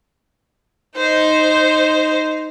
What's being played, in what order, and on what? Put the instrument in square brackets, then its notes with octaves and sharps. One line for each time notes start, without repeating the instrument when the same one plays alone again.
[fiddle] D#4 C5